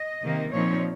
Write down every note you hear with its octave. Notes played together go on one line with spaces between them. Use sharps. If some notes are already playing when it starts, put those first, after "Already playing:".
Already playing: D#5
C3 D#3 A#3
A#2 F3 C4 D#4 C#5